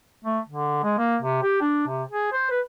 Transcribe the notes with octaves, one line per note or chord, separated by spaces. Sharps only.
A3
D3
G#3
A#3
C3
G4
D4
C3
G#4
C5
B4